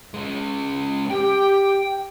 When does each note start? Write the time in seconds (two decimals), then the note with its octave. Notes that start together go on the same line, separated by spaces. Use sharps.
0.14 G#3 C#4
1.11 G4 G5